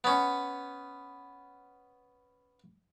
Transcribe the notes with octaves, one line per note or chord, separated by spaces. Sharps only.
B3 C#4